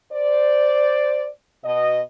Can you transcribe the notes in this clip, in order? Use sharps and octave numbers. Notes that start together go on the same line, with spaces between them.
C5 D5
B2 D#5